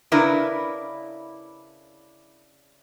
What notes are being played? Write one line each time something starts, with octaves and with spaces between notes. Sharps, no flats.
C#3 D4 E4 A#4 B4